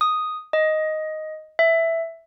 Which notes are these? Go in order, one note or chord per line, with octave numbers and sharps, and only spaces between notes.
D#6
D#5
E5